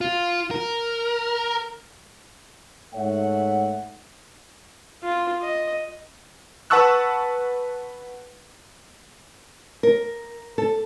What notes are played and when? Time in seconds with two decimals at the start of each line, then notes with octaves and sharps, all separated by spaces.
0.01 F4
0.51 A#4
2.94 G#2 A3 C#5 E5 F#5
5.03 F4
5.42 D#5
6.70 B4 F#5 A5 C#6 E6 F#6
9.83 A#4
10.58 A4